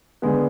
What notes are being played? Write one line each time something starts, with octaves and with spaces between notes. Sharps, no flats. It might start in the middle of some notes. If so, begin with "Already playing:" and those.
D3 G#3 B3